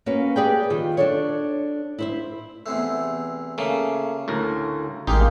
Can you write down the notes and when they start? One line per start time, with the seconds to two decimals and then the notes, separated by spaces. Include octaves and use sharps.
0.06 A#3 C#4 F#4 B4
0.36 G4 G#4 B4 D5 G5
0.70 D#3 F4
0.97 D4 A4 C#5
1.99 E4 C5 E5
2.66 E2 C3 A3
3.58 C#3 A3 A#3
4.28 D2 A2 A#4
5.07 A1 G#3 A#3 D#4 G4